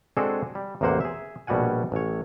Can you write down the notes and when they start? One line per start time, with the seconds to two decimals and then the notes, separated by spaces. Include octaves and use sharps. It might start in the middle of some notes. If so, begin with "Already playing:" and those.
0.17 G#3 C4 D4 F#4 G#4 A4
0.55 G3
0.81 A1 E2 C3 A#3 C5 F#5
1.01 G#4 E5
1.47 A#1 B2 G3 F#4 F#5 G#5
1.92 A1 C#5